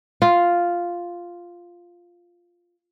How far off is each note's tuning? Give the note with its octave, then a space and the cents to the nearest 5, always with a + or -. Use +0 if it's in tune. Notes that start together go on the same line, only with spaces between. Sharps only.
F4 +0